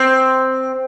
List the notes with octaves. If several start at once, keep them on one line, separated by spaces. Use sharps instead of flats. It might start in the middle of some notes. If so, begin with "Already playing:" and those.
Already playing: C4